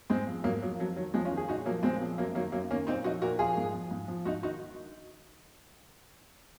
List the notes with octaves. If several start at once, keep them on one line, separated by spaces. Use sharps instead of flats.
G#2 G#3 C4
F3
G#2 F#3 A#3
F3 F#3
F2 F#3
D#3 F#3
F2 F3 G#3
C#4 F4
D#3
G#4
A#2 D#4 F#4
F3 F#3 A#3
A#2 G#3 C4
F3
F#2 F#3 A#3
D#3 F#3 A#3
F#2 F#3 A#3
D#3 A#3 C#4
A#2 C4 D#4
F3 D#4 F#4
A#2 F#4 A#4
F3 F4 G#4
G#2
F3
G#2
F3
G#2 D#4 F#4
D#3 D#4 F#4